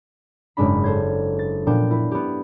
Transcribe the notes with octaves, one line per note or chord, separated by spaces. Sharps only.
F#1 G#2 G#3 D4 B5
A4 C5 G#6
A6
A#2 F3 B3 D4 G5
E4 B4
B3 G4